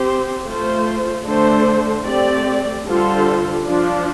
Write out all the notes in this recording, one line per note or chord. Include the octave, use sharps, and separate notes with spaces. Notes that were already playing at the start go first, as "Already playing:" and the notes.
Already playing: C4 G4 C5
A3 F4 C5
D3 A3 D4 A4 C5
A3 C4 G4 D5
D3 G3 F4 A4 C5
F3 D4 F4